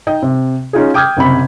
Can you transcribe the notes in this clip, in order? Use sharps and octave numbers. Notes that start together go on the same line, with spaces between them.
D#4 D#5 G5
C3
C#4 D#4 F4 G#4
G5 D6 D#6 F6 G6 G#6
F#1 C3 B5